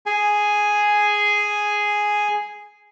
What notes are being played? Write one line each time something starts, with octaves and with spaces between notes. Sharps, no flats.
G#4 G#5